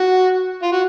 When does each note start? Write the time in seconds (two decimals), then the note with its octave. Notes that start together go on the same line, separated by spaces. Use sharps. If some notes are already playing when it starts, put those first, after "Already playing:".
Already playing: F#4
0.62 F4
0.72 F#4